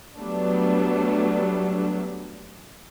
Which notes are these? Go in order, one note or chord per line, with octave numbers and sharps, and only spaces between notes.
F#3 G3 A3 B3 D4